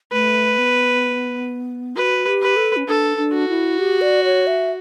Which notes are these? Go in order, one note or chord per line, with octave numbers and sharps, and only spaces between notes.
A3 B4
B3
F#4 B4
G4
B4
A4
C#4
D4 A4
D4
F#4
E4
G4
D5
C#5
E5